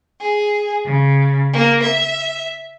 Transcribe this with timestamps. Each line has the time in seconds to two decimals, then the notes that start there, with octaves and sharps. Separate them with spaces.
0.20 G#4
0.85 C#3
1.51 A#3
1.82 E5